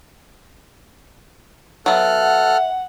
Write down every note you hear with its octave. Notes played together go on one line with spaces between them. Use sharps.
F#3 B3 A4 E5 F6 F#6
F#5